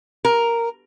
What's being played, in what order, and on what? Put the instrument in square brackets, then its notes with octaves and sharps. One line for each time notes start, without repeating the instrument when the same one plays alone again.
[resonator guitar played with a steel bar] A#4